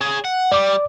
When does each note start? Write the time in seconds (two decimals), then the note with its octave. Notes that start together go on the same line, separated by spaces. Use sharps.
0.01 G#4 C#5
0.25 F#5
0.52 G3 D5 D6